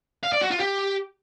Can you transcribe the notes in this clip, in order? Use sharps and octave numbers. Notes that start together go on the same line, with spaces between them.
F5
D5
F#4
F4
G4